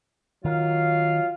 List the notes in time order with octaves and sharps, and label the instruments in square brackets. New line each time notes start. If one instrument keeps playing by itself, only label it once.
[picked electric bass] D#3 [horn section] F#3 F4 F5